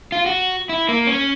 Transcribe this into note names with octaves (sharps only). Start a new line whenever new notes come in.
F4
F#4
E4
A#3
C#4